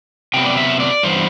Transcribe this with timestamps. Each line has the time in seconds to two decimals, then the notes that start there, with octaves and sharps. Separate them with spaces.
0.34 C3 F#3 B3 G5
0.46 D5
0.57 E5
0.80 D5
1.03 G2 E3 B3 C5